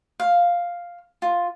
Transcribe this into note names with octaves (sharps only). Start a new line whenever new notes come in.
F5
F4